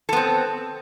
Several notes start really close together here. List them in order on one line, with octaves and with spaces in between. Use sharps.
A4 B3 C4